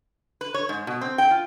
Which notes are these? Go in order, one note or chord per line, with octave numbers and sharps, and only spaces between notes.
B4
C#5
G#2
B2
C4
G5
F4